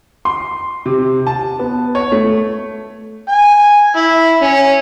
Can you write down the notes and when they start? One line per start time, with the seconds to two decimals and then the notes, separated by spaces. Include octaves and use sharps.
0.25 C6
0.86 C3
1.27 A5
1.59 B3
1.95 C#5
2.12 A3
3.29 G#5
3.96 E4
4.42 C#4